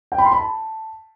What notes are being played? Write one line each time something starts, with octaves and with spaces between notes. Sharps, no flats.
G5
B5
C6
B5
A5